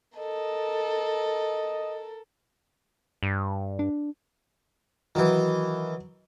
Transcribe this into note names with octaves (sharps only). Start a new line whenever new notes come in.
A4 A#4 D#5
G2
D4
D#3 E3 F#3